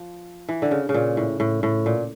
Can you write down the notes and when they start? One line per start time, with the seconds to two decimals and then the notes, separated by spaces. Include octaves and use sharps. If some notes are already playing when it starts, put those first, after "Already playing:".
Already playing: F3
0.49 E3
0.62 D3
0.71 C#3
0.89 C#3
0.94 A#2
1.17 A2
1.40 A2
1.63 A2
1.86 A#2